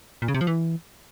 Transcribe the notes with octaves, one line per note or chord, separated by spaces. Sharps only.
A#2
C#3
C3
F3
E3